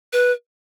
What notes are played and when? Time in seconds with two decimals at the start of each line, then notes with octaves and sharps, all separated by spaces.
0.13 B4